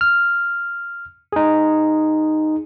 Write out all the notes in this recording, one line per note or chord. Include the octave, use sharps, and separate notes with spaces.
F6
D#4 G#4